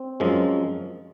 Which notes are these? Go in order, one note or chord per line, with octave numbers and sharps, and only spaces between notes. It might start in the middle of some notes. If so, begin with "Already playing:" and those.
Already playing: C4
F#2 F3 G#3